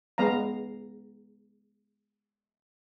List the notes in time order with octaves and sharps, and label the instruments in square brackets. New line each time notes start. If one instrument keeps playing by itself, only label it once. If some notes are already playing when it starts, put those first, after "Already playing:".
[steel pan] G#3 B3 F5 A#5